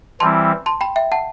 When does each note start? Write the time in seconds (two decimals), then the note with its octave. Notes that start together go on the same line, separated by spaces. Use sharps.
0.20 E3 G3 C4 E4 A5 C6
0.66 A5 C6
0.81 G5 B5
0.96 E5 G5
1.12 F#5 A5